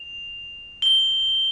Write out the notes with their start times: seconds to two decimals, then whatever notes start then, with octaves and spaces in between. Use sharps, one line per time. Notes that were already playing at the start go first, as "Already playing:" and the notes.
Already playing: F7
0.82 G7